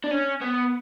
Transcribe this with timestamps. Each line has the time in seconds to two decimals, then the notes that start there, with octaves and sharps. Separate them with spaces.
0.04 D4
0.11 C#4
0.42 B3